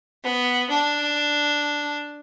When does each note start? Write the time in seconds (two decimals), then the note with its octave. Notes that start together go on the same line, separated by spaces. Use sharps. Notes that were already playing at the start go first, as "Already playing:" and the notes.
0.24 B3
0.70 D4